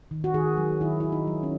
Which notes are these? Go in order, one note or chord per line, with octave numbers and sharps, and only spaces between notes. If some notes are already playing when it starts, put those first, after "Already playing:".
D#3
F#4
D#3 G#4
F#3
D#3 E4
D#3 E4
D#4
F#3
C#4